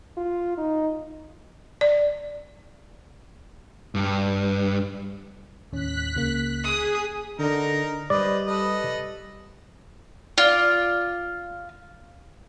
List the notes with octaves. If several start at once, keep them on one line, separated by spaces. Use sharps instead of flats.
F4
D#4
D5
G2
D#2 A2 C#4 F#6 B6
C#2 C#3 A#3
G#4 D#6
D3 D#4 A#4
G3 B4 C5 D5 D#5
A4 B4 D#5
F4 D5